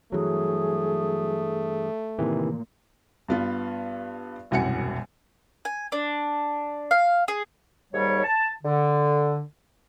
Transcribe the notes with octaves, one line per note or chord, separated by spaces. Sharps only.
G2 E3 F#3 A3 G#4
A2 C3 D#3 E3 A#3
G2 B3 F4
E1 C2 F#2 F#5 G#5 C#7
G#5
D4
F5
G#4
D#2 G#2 G3 C#5
A5
D3